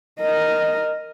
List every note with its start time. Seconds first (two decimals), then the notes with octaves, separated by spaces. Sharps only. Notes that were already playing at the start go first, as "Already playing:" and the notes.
0.20 A#4 D#5